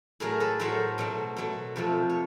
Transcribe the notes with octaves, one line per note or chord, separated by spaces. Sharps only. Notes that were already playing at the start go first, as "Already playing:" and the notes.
A2 F#3 A3 G#4 A#4
A4 B4
A2 F#3 A3 A#4 C5
B2 F#3 A3
B2 F#3 A3
F2 C3 F3 A3
C#5